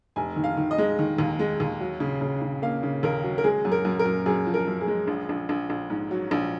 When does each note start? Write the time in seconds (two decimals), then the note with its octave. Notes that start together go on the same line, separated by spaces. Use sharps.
0.16 F1 G#5
0.36 D#3
0.44 F5
0.57 D#3
0.71 D#5
0.78 G#3
0.99 D#3
1.18 D#2
1.39 G#3
1.60 D#2
1.80 F#3
2.00 C#3
2.21 C#3
2.42 C#3
2.62 A#3 F5
2.83 C#3
3.03 D#2 A#4
3.24 F#3
3.38 A#4
3.44 G#3 G#4
3.65 F#2
3.72 A#4
3.85 F#2
3.99 A#4
4.05 F#2
4.26 F#2 G#4
4.46 F3
4.54 A#4
4.67 F#2
4.81 G#4
4.88 G#3
5.07 A#1
5.29 A#1
5.49 A#1
5.70 A#1
5.90 G#2
6.11 F#3
6.31 A#1